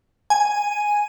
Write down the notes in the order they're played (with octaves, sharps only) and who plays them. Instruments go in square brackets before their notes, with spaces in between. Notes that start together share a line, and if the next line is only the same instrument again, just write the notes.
[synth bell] G#5